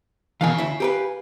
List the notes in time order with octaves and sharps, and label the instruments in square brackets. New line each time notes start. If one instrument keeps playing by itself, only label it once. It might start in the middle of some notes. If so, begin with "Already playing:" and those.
[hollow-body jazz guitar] B2 D#3 E3 [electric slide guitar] F5 G#5
[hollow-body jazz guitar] D2 E4
G4 A#4 B4